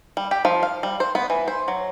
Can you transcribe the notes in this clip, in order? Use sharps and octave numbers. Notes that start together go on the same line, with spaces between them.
G3
G4
F3
F5
G3
C5
B3
E3
C5
F#3